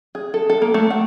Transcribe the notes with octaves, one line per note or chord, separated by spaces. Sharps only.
G#4
A4
A4
A#3
A3
F#5